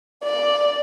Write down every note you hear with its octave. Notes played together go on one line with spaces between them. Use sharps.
D5